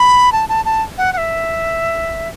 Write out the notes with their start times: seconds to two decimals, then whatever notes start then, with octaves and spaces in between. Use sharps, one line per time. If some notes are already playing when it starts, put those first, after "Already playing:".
Already playing: B5
0.32 A5
0.49 A5
0.65 A5
0.98 F#5
1.13 F#5
1.18 E5